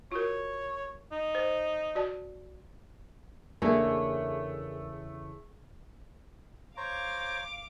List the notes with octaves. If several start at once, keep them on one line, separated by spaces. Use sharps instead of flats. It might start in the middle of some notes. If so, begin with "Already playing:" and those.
F4 F#4 A#4 C#5
D#4
C5
F#4 D5 A5
E2 C#3 A3 A#3 D4 G#4
C5 C#5 F5 A#5 D6